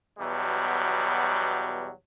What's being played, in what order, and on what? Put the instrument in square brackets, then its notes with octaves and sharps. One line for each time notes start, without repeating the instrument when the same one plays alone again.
[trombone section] E2 B2 F#3 G3